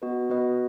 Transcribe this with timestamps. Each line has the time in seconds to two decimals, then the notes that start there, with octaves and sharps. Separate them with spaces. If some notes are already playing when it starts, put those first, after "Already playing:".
0.02 B3 F#4 B4 D#5
0.30 B3 F#4 B4 D#5